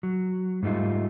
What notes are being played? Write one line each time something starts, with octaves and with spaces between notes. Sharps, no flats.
F#3
G#2 G3 A3 D#4 F4